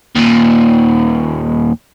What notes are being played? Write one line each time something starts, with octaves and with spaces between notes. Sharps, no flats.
D#2 A#2